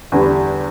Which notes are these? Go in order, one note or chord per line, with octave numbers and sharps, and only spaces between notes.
E2 D3 G3